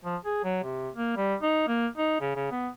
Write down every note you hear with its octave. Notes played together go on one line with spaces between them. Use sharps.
F3
G#4
F#3
C3
A#3
G3
D#4
A#3
D#4
C#3
C#3
B3